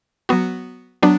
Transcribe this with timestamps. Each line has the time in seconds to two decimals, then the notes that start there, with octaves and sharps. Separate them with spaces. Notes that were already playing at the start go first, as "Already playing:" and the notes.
0.29 F#3 B3 F#4
1.03 F#3 B3 D4